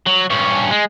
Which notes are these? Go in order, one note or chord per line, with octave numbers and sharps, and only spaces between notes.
F#3
G2 C#4
G#3